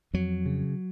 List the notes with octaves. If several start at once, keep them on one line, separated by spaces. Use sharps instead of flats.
F2 F#3
C#3